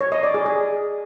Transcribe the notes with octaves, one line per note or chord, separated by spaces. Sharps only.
C#5
D#5
D5
G#4
G#4